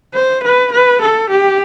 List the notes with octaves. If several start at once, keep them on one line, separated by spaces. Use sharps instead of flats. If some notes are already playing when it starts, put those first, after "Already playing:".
C5
B4
B4
A4
G4